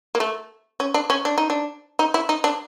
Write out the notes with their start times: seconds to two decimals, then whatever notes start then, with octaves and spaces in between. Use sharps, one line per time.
0.15 A#3
0.20 A3
0.80 C#4
0.94 D4
1.10 C#4
1.25 D4
1.38 D#4
1.50 D4
1.99 D#4
2.14 E4
2.29 D#4
2.44 D4